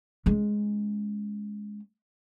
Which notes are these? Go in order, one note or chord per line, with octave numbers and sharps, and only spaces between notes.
G#3 C#4